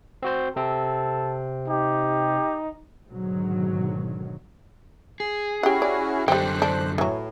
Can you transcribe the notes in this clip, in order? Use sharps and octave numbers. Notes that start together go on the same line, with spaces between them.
C4 F#4 C5
C3 C4 A4
D#4 G4
G#2 B2 D3 D#3 F#3
G#4
C#4 E4 F#4 G4 F#5
D5
F#2 D3 G3 A4 C5 G5 F#6
D4
A2 E3 F#3